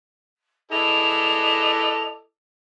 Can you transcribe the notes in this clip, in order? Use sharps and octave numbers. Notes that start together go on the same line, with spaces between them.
E4 G#4 A4 B4 D5 D#5 F7